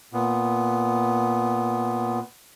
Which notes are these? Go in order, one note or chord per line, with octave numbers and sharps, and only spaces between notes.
A#2 B3